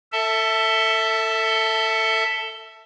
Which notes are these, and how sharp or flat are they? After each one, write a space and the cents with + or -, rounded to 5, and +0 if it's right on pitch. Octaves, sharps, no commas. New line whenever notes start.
A4 +25 E5 -5 A5 +0